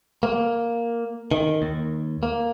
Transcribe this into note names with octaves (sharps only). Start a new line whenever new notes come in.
A#3
D#3
D#2
A#3